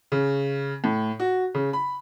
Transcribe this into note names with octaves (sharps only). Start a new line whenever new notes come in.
C#3
A2
F#4
C#3
B5